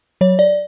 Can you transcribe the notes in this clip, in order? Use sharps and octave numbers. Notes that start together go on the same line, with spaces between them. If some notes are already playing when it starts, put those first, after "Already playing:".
F#3 C#5
D5